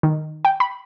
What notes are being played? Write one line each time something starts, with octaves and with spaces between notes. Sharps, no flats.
D#3
G5
B5